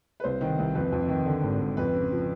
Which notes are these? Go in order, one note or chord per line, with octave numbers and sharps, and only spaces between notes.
B4
C2 C5
D#3
C2
F2 B4
F2
D#3
D3
G#1
G#1
F2 B4
C#3
F3